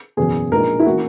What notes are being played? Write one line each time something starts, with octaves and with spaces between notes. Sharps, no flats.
F#1 E2 B2 G#4
A#1 A#2 G#3 D#4 A#4
E4
E3 A#3 C#4 F#4